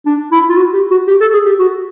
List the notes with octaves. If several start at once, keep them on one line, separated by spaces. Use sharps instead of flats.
D4
E4
F4
F#4
G4
F#4
G4
A4
G#4
G4
F#4